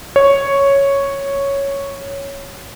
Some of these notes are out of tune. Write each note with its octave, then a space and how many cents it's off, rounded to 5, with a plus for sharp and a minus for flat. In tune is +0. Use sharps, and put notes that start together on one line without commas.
C#5 +0